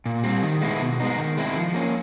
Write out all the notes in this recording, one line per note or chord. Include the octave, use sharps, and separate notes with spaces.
A#2
G3 C4
D#3
G#3 B3 E4
B2
G#3 B3 D#4
D#3
G#3 C4 E4
F3
A#3 C#4